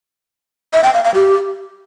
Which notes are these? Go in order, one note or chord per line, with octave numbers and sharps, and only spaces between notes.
E5
G5
F5
F5
G4